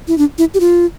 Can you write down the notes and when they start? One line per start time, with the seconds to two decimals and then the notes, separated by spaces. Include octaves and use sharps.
0.08 E4
0.18 D4
0.38 E4
0.54 G4
0.60 F4